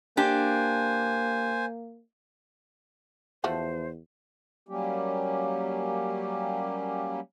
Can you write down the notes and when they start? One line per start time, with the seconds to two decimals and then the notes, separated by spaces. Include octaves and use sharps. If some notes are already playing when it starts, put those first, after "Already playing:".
0.17 A#3 D4 G4 C5 G#5
3.44 E2 F3 A3 F#4 C5
4.69 F#3 G3 A#3 C#4 G4